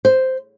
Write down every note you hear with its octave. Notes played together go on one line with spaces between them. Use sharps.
C5